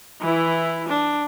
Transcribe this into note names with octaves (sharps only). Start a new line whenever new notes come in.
E3 E4
D4